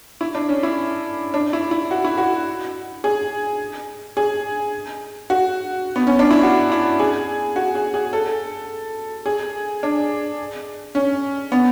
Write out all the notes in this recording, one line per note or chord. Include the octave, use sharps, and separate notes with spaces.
E4
D4
C#4
E4
D4
E4
E4
F#4
E4
F#4
G#4
G#4
F#4
B3
C#4
D4
E4
F#4
E4
G#4
F#4
G#4
G#4
A4
G#4
D4
C#4
B3